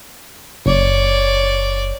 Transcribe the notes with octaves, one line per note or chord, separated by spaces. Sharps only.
F#1 C#5 D5